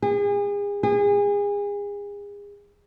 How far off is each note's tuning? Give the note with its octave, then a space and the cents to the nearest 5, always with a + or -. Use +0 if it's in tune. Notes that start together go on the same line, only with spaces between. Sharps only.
G#4 -40
G#4 -35